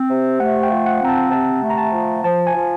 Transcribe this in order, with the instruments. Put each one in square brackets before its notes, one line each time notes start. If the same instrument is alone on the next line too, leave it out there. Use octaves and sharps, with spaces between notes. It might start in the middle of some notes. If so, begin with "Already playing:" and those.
Already playing: [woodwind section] C4
C3
[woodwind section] A3 [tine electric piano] F#5
[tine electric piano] G5
[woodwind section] F3
[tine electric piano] F#5
[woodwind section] C4 [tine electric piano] A#5
[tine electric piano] A5
[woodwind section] C3 [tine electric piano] A5
[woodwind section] A3
[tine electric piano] A#5
A5
[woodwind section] F3
[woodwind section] F3 [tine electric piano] A5
[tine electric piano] G#5
[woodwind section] F3